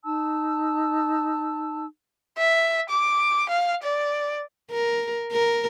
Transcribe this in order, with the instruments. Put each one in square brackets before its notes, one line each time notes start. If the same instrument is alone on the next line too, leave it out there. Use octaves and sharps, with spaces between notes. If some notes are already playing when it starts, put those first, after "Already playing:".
[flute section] D#4 A5 E6
[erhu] E5
D6
F5
D5
[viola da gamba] A#4
A#4